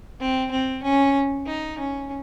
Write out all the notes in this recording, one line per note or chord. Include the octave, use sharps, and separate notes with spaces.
C4
C4
C#4
D#4
C#4